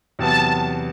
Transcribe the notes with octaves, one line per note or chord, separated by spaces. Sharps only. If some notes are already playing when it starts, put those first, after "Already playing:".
E2 C3 F#3 B3 A5